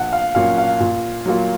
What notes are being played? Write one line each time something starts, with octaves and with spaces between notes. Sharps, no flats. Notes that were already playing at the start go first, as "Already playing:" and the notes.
Already playing: A#1 F#5
F5
A#2 F#3 A#3 C#4 F5
F5
A#2
F#3 A#3 F4